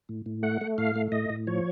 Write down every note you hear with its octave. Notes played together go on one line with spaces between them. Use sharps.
A2
A2
A3 F#5
A3
A2 F5
A3
A2 D#5
A2
F3 C#5